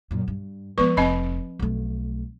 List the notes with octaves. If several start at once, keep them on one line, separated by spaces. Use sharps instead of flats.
F#2 A#2
G2
F3 G#3 B3 B4 C#6
F1 C4 D#5 B5
B1 A3